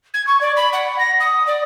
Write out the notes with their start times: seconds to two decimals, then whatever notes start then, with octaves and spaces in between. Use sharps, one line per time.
0.14 G#6
0.27 C#6
0.41 D5
0.57 B5
0.73 F#5
0.99 A#6
1.20 D#6
1.47 D5